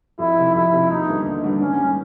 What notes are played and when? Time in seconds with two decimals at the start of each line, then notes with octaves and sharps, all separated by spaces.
0.19 F2 E4
0.37 C3 F3
0.55 F2 E4
0.72 C3 F3
0.90 D#2 D#4
1.07 D3 G3 B3 D4
1.25 D#2
1.43 D3 G3 B3 D4
1.60 G#2 C#4
1.78 D#3 G3